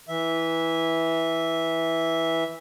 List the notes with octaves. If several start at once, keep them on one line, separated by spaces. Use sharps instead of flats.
E3 E5